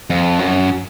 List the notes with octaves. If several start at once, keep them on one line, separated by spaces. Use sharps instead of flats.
F2
F#2